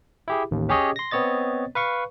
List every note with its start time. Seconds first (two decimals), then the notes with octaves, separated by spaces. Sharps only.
0.28 E4 G4 G#4
0.51 A1 D#2
0.69 C#4 G4 G#4 C#5 D#5
0.96 C6 A#6
1.11 B3 C4 C#5 D#5 A6
1.75 B4 F5 C#6